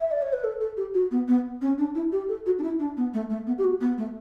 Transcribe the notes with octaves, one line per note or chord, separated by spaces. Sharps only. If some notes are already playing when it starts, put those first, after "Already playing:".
E5
D5
C#5
B4
A4
A4
G4
F#4
B3
B3
C#4
D4
E4
G4
A4
F#4
D4
E4
D4
B3
A3
A3
B3
G4
F#4
B3
A3